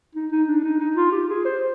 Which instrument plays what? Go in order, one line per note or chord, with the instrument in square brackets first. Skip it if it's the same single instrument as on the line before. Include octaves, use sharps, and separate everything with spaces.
[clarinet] D#4
D#4
D4
D#4
D#4
F4
G4
G#4
C5